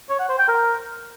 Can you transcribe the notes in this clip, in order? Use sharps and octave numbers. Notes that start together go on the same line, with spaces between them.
C#5
F#5
C5
G5
A#4